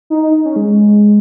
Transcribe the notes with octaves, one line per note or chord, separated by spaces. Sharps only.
D#4
D#4
C#4
G#3